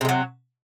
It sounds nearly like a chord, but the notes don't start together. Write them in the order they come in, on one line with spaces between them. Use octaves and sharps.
C3 G#3 F#3